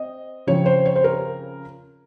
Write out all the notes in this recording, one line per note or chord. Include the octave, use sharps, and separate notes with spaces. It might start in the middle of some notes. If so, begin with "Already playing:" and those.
Already playing: C4 D#5
C#3 F3 C4 C#5
C5
C#5
C5
A#4